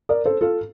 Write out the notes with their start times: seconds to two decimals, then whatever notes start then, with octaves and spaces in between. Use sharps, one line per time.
0.09 A#4 D5
0.26 A4 C5
0.41 F4 A4